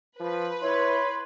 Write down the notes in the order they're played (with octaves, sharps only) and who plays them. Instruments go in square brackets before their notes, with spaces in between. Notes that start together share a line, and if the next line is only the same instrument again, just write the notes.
[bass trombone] F3 [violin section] B4
[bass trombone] E4 [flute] C#5 [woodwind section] B5 C6